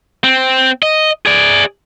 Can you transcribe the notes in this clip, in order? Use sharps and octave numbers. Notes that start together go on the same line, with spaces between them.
C4
D#5
G#4 D5